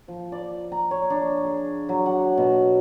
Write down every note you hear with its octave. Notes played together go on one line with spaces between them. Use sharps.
F3
D5
A#5
C#5
D4
G#4
F#3
F#5
B2